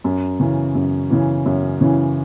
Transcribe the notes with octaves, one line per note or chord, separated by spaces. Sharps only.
F#2
C#3 E3
F#2
C#3 E3
F#2
C#3 E3